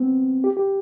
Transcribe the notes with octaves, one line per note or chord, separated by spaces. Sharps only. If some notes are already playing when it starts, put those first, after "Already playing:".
Already playing: B3 C4
G4
G4